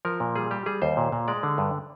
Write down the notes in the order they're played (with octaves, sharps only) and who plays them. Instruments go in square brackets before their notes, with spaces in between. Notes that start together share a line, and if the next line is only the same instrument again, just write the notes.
[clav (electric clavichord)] F3 A#4
A#2
G3 G#4
G3 G4
G3 G#4
D#2 C5
A#2
A#2
G#3 D5
D3
G2